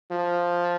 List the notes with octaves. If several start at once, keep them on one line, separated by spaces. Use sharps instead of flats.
F3